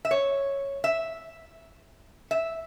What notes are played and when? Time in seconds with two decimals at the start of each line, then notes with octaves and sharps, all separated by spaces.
0.05 E5
0.11 C#5
0.84 E5
2.31 E5